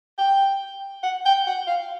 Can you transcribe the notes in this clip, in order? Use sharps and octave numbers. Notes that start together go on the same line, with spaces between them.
G5
F#5
G5
F#5
F5